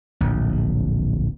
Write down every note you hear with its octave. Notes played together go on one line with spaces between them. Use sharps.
D1 A#1